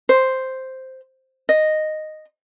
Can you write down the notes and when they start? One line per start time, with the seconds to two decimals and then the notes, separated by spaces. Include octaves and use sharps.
0.09 C5
1.49 D#5